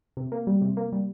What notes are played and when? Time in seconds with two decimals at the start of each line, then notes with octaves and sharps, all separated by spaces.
0.17 C3
0.32 A#3
0.47 G3
0.62 C3
0.77 A#3
0.92 G3